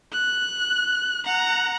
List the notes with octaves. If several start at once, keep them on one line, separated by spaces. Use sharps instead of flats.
F#6
F#5 A#5